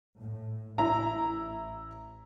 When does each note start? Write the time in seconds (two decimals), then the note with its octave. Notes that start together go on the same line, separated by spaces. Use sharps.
0.20 A2
0.78 A1 E4 A#5